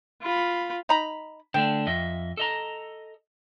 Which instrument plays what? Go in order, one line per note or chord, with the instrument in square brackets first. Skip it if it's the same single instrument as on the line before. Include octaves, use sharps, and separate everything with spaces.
[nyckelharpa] F4 B5
[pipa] D#4 A#5 B5
[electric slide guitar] D3 A3 D4 [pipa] G5
[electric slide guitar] F2 D#5 E5
A4 D#5 A#5